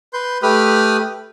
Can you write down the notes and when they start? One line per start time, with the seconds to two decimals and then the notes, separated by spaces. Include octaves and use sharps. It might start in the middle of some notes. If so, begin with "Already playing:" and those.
0.13 B4 C6 G6
0.43 A3 G4 B4 B5 D#6 F6